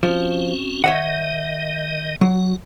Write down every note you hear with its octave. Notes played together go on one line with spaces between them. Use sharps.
F3 C4 C#4 F#4
D#3 C#5 D#5 E5 F#5
F#3 F#4